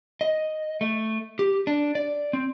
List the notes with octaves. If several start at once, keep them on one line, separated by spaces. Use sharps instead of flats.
D#5
A3
G4
D4
D5
C4